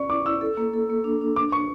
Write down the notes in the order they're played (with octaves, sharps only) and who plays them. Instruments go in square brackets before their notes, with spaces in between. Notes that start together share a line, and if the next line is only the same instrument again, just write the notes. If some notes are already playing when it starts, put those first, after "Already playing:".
Already playing: [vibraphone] C#4 D5 [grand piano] C#6
[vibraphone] E4 [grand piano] D6
[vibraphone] E4 [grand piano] E6
[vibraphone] A4
A#3
A4
A#3
D4
D4
[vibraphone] D4 [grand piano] D6
[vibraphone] D4 [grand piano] C#6